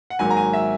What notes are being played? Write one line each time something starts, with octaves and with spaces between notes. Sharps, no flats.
F#5
G#1 G#2 F#3 A#3 G#5
A#5
G#5
E5